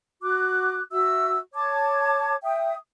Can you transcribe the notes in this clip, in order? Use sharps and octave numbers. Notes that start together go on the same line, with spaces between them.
F#4 D6 F#6
F#4 E5 E6
C#5 A5 D6 G#6
E5 G5 D#6